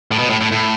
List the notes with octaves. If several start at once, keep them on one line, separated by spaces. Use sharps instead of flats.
A2
B2
A2
A2
A2